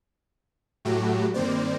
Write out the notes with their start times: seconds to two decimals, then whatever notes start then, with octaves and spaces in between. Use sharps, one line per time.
0.85 A2 F#3 A3 F#4 G4
1.34 G2 D#3 A#3 C4 C5 D5